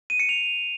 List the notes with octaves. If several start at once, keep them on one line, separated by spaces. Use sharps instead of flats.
D#7
C#7
F7